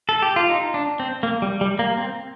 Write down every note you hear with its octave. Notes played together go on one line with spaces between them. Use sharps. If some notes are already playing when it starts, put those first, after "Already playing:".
A4
G4
F4
D#4
D4
C4
A#3
G3
G3
A#3
C4